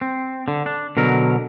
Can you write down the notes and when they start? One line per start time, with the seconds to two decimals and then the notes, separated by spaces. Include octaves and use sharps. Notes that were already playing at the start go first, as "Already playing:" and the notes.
0.01 C4
0.48 D3
0.66 D4
0.97 B2 D3 F#3 A#4